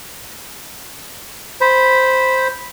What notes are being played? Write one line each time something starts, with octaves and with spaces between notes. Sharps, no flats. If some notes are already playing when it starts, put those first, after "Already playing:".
C5 B5